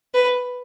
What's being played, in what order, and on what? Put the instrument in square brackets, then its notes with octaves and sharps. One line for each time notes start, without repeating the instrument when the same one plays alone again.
[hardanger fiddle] B4